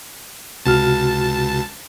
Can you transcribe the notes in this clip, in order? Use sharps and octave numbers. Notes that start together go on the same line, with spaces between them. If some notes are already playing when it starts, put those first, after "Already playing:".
C#2 C3 F#4 A5 F6